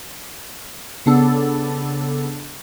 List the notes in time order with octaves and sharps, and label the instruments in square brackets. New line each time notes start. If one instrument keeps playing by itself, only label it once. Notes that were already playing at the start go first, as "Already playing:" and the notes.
[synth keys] C#3 B3 D4 A4